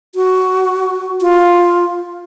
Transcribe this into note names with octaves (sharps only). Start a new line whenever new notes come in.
F#4
F4